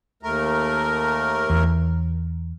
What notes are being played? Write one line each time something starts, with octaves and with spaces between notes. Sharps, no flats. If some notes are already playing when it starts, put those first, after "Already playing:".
D#2 A3 A#4
E2